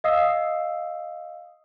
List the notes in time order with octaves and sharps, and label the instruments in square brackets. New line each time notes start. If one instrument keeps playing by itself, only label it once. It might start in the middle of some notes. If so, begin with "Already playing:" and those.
[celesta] D#5 F5 D#6 E6 C7